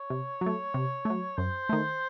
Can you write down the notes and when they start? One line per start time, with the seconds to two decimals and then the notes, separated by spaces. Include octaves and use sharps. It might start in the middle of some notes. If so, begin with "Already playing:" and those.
Already playing: C#5
0.10 C3
0.41 F#3
0.46 A3
0.74 C3
1.05 F#3 A3
1.37 F#2 C5
1.69 D#3 A3